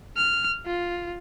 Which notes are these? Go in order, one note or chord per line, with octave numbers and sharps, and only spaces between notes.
F6
F4